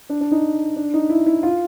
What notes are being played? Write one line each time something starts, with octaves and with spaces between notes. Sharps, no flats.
D4
D4
D#4
D4
D#4
E4
E4
F4